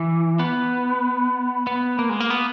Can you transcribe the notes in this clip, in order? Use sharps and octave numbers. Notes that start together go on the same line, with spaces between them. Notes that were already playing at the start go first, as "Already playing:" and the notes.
Already playing: E3
B3
B3
A#3
G#3
A#3
B3